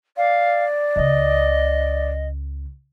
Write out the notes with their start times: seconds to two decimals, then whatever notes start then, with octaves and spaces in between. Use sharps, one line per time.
0.17 D5 F5
0.96 C#2 C#3 D#5